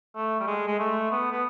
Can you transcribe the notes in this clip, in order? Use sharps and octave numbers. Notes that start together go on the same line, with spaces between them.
A3
G3
G#3
G#3
A3
B3
B3